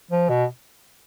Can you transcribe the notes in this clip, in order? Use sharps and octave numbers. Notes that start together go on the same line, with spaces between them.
F3
B2